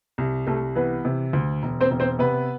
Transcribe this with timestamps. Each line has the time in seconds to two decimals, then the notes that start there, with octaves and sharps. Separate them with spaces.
0.18 C2
0.47 C2 A3 A4
0.75 E3 B3 B4
1.05 C3
1.33 D2
1.63 E1
1.81 C4 C5
1.91 E1
2.00 C4 C5
2.19 C3 B3 B4